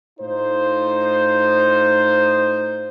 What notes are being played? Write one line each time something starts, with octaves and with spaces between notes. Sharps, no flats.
A2 D#4 F4 C5